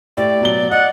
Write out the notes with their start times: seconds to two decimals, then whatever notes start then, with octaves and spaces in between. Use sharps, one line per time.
0.17 A2 G4 D5
0.41 B2 F#3 G7
0.71 D5 D#5 F#5